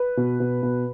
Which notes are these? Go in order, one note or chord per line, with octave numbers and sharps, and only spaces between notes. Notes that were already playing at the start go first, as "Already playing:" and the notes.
Already playing: B4
B2
B2
B2